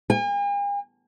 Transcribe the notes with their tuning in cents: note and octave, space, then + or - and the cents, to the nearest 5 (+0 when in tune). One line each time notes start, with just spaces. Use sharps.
G#5 -45